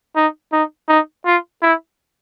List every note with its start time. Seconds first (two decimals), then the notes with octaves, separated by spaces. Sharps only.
0.16 D#4
0.52 D#4
0.89 D#4
1.26 F4
1.62 E4